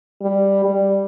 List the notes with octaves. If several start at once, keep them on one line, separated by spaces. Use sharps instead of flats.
G3
G3